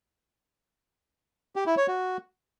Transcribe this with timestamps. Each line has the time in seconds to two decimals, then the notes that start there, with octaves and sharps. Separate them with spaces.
1.56 G4
1.66 E4
1.77 C#5
1.88 F#4